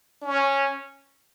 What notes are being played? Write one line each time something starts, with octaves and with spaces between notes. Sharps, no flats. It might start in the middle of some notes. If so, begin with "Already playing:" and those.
C#4